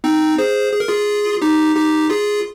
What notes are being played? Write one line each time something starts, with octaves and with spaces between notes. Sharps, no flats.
C4 D#4
G#4 C5
G#4
A#4
F4 G#4
D#4 G4
D#4 G4
F4 G#4